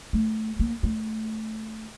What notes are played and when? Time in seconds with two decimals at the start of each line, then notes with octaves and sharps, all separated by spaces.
0.13 A3
0.59 A#3
0.83 A3